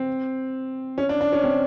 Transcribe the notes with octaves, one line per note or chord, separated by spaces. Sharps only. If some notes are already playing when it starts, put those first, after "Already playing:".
Already playing: C4
C#4
D4
D4
C#4
C4